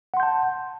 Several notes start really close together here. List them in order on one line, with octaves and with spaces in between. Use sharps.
F#5 C6 G6 A5